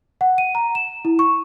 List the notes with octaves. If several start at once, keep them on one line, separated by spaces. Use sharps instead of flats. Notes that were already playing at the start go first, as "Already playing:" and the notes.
F#5
D#7
A#5
E7
E4
C#6